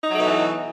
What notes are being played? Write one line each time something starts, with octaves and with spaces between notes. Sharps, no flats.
B2 E3 F#3 A3 D#4